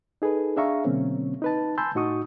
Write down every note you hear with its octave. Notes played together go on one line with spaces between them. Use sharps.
D#4 G#4 A4 B4
D4 G#4 E5 F5 A#5 C#6
B2 D3 F#3 A#3 C4 C#4
D#4 B4 A5
G#5 A5 B5 C6 E6 G6
A2 D#4 F#4 C#6 D#6